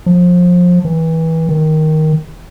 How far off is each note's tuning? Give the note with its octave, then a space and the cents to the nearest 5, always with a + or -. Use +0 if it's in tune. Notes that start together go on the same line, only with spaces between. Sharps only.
F3 +25
E3 -25
D#3 +5